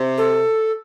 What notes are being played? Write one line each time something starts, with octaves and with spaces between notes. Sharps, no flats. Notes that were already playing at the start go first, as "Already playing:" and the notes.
Already playing: C3
A4